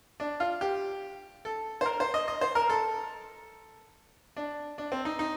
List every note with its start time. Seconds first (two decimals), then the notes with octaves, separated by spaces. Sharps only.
0.20 D4
0.40 F4
0.61 G4
1.45 A4
1.81 C5
1.86 A#4
2.00 C5
2.14 D#5
2.28 D#5
2.41 C5
2.55 A#4
2.69 A4
4.37 D4
4.78 D4
4.92 C4
5.05 D#4
5.19 D#4